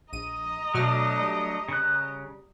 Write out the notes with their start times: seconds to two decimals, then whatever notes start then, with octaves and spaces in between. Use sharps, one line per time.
0.13 A#1 D#5 A#5 D#7
0.74 B2 F#3 A3 D4 F6
1.20 G3
1.69 C#3 F#6